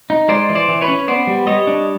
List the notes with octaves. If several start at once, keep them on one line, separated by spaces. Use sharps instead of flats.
D#4
G#3 C5 D5
E3
C5 D5
E3
B4 C#5
C#4
B3 C5 D5
G3
G3 C#5 D#5
D4